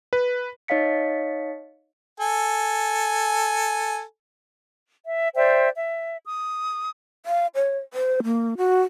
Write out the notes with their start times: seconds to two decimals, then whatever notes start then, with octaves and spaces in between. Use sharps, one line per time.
0.13 B4
0.68 D#4 C#5 D#5 F5 B6 C#7
2.20 A4 G#5
5.06 E5
5.36 C5 D5 E5 G5
5.77 E5
6.25 D#6
7.26 F5
7.55 C#5
7.94 C5
8.24 A#3
8.58 F#4